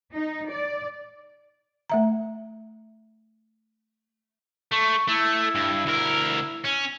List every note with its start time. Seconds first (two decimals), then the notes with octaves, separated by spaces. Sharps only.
0.13 D#4
0.50 D5
1.90 A3 E5 A#5
4.72 A3 C#6
5.09 A3 E4
5.55 G2
5.86 D2 A#4
6.64 C#4